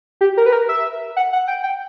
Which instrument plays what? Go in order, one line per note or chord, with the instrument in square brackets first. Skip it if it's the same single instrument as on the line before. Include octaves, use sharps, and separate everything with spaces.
[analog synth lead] G4
A#4
B4
A#4
E5
F#5
F#5
G5
G5